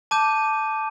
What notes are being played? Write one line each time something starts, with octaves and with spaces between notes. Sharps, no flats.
A5 D6 G6 D#7